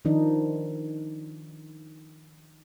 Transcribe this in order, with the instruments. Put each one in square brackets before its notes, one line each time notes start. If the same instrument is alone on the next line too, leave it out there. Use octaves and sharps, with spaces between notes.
[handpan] D#3 F3 D4 D#4